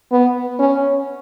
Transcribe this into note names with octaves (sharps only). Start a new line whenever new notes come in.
B3
C#4